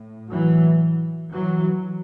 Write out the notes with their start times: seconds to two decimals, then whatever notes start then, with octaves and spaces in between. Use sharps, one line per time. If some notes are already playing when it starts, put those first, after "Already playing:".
Already playing: A2
0.30 E3 F#3
1.32 E3 F#3